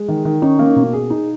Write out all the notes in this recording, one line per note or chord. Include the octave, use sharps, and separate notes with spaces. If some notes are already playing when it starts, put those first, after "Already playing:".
Already playing: G#3
D#3
D#3
C#4 D#4
A#3
B2
G#4
D#4